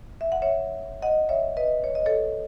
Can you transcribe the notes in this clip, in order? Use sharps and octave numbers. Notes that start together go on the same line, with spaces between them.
E5
F#5
C#5 E5
D#5 F#5
C#5 E5
B4 D#5
C#5
D#5
A4 C#5